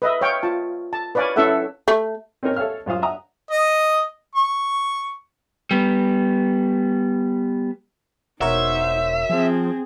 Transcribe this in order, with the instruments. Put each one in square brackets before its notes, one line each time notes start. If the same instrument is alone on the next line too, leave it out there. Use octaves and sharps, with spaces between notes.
[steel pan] B4 D#5 E5
C#5 F5 G5
F4 A5
A5
B4 C#5 D5 F5 G#5
C#4 E4 A4 E5 F#5
[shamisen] A3
[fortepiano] C4 C#4 D#4 A#4 C#5
A4 C#5 E5 F5 F6
F#2 F4 C5 F5 D#6
E5 F#5 A#5 D#6
[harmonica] D#5
C#6
[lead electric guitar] G3 B3
[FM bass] E1 [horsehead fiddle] D#4 C5 [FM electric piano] F#4 A#4 C#5 [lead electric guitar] E5
[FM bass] F3 [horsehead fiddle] C4 G#4